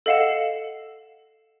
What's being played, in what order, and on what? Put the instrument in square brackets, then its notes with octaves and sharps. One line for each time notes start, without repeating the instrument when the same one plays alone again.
[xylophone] A4 D#5 F5 F#5 E7